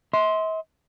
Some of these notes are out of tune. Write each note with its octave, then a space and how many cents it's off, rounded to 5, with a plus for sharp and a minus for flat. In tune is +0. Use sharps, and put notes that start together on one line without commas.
E5 -45 C6 +0